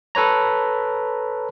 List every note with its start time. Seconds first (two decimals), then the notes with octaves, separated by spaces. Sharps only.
0.15 A4 B4 C#5 A#5